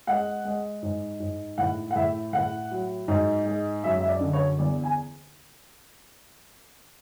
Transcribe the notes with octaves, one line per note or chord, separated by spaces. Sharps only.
G#3 F#5
G#3
G#2
G#2
A2 F#5
F#5
A2 E5
A2 F#5
F#3
G#2
G#3
F#2 E5
E5
D5
D3
C#5
E2 D5
G#5